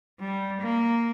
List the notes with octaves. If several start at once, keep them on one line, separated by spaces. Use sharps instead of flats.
G3
A#3